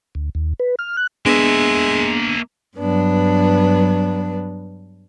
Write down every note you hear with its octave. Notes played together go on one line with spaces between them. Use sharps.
D2
D#2
B4
F6
F#6
G#3 A#3 B3 D4 E5
G2 F#3 B3 D4 B4